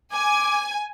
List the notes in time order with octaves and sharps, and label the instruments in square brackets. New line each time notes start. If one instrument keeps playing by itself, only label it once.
[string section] G#5 [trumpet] D6